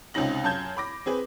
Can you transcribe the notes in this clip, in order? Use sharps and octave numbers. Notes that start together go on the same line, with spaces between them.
C#2 C3 C#4 D#4 A#6 F#7
F#2 A5 G6 G#6
B5 D6 A#6
C4 G#4 B4